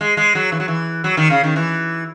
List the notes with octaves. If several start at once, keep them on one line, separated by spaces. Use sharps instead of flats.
G#3
G#3
F#3
E3
F#3
E3
F#3
D#3
C#3
D#3
E3